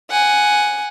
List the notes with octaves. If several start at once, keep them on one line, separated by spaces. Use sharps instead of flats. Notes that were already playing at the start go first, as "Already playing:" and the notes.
F#5 G#5